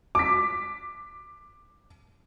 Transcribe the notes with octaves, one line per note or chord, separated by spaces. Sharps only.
D6 B6